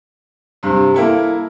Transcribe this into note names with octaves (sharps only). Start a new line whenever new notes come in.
G2 C3
A#3 E4 A4